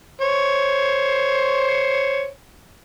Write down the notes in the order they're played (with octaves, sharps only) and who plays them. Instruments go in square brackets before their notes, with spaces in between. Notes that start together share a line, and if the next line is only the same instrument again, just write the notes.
[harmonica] C5 C#5